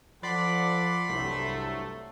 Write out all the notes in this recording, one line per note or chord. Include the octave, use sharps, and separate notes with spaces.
F3 A4 D5 F#5 B5 C6
C2 G2 F#3 A3